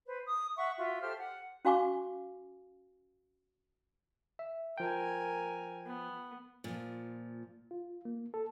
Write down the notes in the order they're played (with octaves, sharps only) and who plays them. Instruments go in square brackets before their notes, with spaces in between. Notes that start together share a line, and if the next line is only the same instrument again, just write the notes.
[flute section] B4 C5
D#6
E5 F#5 C#6
F4 F#4 E5
G4 A4 C5 F6
F#5
[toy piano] C#4 F#4 F5 G#5 C#6 D6
[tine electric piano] E5
[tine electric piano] F3 G5 [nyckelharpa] A#4 G#5
[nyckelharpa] B3
[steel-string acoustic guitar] A#2 F3
[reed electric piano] F4
A#3
A4